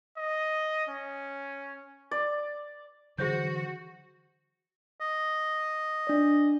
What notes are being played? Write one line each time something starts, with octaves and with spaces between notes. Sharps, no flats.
D#5
C#4
D5
D3 E3 F#3 F#4 G#4 C5 G6
D#5
D4 D5